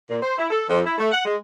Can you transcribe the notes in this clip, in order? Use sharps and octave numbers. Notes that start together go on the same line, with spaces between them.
A#2
C5
E4
A4
F2
E4
A3
F#5
G#3